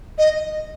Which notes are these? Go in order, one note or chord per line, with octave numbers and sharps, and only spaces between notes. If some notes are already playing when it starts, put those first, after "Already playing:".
D#5